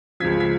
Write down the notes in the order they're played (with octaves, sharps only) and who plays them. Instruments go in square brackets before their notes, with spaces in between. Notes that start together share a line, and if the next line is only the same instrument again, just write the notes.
[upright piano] C#2 C#3 F3 G#6 B6
G#6 B6